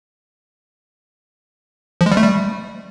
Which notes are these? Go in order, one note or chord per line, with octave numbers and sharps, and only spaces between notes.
F3
G#3
G3
A3
G3